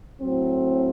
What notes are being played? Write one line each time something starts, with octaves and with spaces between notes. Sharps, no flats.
A2 F#3 C4